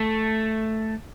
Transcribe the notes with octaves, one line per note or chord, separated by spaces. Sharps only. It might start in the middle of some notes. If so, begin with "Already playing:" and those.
Already playing: A3